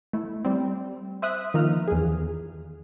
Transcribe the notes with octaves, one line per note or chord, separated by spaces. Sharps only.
A3 E4
G3 C4
C5 E5 D#6 F#6
D#3 F3 A#3 D#4 F6
E2 G#4